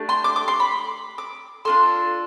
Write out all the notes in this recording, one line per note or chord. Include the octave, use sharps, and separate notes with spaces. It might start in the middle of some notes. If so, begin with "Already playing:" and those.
Already playing: A3 D4 G4
C6
D6
D6
C6
B5
D6
D4 F4 A4 C6